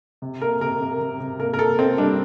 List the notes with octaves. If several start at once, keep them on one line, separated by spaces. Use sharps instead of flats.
C3
A#3 A#4
C3 A#4
C3
C3
C3
A#3 A#4
A#4
A#3 A4
A#3 C4
G3 D4